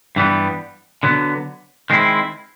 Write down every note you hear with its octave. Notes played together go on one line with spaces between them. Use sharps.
G2 E3 G3 B3
D3 F#3 B3
D#3 G#3 C4 E4